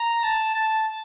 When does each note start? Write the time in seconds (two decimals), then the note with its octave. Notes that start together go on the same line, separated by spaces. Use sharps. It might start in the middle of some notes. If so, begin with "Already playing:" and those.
Already playing: A#5
0.24 A5
0.55 A5